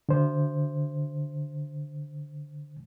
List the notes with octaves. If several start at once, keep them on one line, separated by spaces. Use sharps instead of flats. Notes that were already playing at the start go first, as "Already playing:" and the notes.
D3 C5